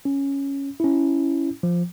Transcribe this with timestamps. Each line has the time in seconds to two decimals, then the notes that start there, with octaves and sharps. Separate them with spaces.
0.05 C#4
0.80 C#4 E4
1.63 F3